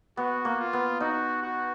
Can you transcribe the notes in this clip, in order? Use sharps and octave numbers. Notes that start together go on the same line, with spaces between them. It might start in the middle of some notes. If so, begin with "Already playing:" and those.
B3 F#4
A#3
F4
B3
D#4 F#4
F#4